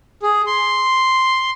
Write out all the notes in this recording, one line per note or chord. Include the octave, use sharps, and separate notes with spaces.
G#4
C6